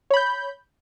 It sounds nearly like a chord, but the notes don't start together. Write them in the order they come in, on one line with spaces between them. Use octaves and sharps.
C#5 B5 G6